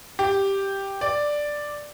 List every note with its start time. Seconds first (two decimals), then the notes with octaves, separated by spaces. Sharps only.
0.19 G4
1.01 D5